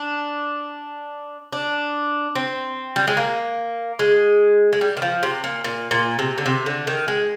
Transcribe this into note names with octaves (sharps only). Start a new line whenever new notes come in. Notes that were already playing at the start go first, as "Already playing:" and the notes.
Already playing: D4
D4
C4
G3
G#3
A#3
G#3
G#3
G3
D#3
F3
C3
A#2
A#2
A#2
C3
D3
C3
D3
D#3
G#3